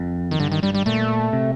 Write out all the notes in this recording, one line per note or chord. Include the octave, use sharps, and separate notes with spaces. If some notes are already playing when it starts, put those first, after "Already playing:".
Already playing: F2
D#3
G2 D3
D#3
G2 G3
G3
A#2 A3
C3